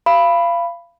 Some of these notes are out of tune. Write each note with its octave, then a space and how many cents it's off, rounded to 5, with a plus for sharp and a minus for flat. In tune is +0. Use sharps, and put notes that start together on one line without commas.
F5 -25 B5 +0